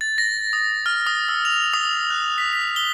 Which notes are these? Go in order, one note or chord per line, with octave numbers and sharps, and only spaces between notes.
A6
A#6
D#6
F6
D#6
E6
F7
D#6
F#6
B6
B6
G7